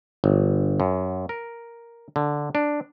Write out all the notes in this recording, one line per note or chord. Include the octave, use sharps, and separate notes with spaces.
G1
F#2
A#4
D3
D4